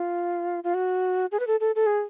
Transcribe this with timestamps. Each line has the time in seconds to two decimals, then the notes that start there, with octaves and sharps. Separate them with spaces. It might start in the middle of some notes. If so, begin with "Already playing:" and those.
Already playing: F4
0.64 F4
0.74 F#4
1.32 G#4
1.40 B4
1.47 A4
1.60 A4
1.75 A4
1.86 G#4